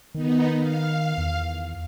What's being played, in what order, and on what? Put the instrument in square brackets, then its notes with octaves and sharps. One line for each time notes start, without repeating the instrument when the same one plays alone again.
[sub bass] D#3 [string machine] B3 D#4
[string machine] F5
[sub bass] E2